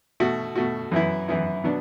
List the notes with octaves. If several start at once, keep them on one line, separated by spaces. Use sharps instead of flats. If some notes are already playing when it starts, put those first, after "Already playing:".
B2 A3 F#4
B2 A3 F#4
F#2 E3 B3 E4
F#2 E3 B3 E4
B2 F#3 B3 D4